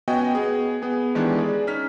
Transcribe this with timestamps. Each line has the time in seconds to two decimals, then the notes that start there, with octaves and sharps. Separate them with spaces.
0.08 B3 C#4 F#4 D#5 G5 G#5
0.35 B3 G#4
0.82 B3 G#4 G#5
1.15 D#3 E3 G#3 B3 D4 G4
1.38 G#4 D5
1.67 C#4 D#4 F6 B6